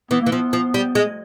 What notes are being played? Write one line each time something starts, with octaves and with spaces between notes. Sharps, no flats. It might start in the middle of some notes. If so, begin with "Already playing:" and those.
E3 B3
E3 A#3
F3 B3
F3
G3
G#3